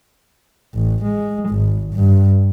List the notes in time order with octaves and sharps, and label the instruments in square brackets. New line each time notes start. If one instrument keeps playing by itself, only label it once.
[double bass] A1
G#3
G#1
G2